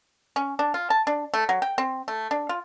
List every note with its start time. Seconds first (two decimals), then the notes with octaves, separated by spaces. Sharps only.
0.36 C#4
0.59 D4
0.74 F4
0.90 A5
1.07 D4
1.34 A3
1.49 F#3
1.62 G5
1.78 C4
2.08 A3
2.31 D4
2.49 F4